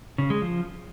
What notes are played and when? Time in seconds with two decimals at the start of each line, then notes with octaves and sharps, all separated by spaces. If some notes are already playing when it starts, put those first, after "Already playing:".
0.18 C#3
0.30 G#3
0.42 F3